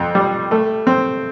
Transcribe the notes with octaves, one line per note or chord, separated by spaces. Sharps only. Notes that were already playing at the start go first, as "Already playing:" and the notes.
Already playing: F2
G3
A3
C4